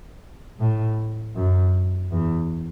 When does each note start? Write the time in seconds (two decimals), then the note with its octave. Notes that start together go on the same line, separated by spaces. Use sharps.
0.60 A2
1.36 F#2
2.12 E2